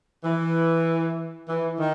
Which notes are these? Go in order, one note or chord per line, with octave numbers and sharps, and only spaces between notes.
E3
E3
D#3